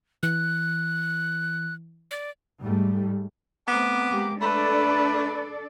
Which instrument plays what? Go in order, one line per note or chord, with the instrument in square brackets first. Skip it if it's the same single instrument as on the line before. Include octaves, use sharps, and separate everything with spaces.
[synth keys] E3 [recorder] F#6
[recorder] D5
[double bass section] G#2 G3 A3
[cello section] A3 C4 [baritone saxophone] B3 [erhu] D6
[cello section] G#3 A#3 G4
[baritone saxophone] A3 [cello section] D4 A4 D5 [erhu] B4